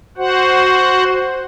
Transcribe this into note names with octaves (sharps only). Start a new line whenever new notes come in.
F#4 C5 F#5